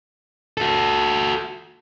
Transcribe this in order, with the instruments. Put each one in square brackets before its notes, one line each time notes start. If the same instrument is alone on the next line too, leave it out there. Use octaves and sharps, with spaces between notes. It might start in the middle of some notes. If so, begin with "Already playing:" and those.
[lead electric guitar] F#4 A4